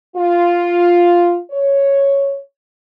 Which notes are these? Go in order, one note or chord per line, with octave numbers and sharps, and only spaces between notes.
F4
C#5